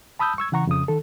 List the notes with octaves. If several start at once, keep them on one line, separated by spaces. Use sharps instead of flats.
A5 B5 D#6 E6 G6
C#6 E6 G#6
C#3 E3 F#5 A#5 C#6
F2 C#3 D#6
D#3 A4